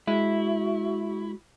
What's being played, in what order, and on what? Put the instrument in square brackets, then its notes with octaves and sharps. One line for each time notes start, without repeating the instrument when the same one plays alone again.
[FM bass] G#3 [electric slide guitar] E4 [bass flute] F#4